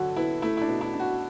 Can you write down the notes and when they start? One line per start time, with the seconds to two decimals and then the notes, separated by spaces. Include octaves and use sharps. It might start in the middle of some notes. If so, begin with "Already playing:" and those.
Already playing: D3 F#3 F#4 A4
0.16 B3 E4
0.42 A3 E4
0.57 E4
0.61 D4
0.68 B2
0.81 E4
0.94 D4
1.00 F#4